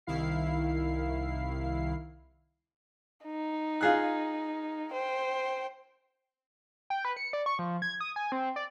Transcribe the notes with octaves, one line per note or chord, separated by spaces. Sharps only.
C2 D#3 E4 F5 C7
D#4
F4 G#4 F#6
C5 G5
G5
B4
C#7
D5
C#6
F3
G#6
D#6
G#5
C4
D5